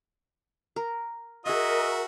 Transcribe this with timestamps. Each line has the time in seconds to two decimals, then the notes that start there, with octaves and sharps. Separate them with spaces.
0.76 A#4
1.46 F#4 G#4 A#4 D#5 E5 G#5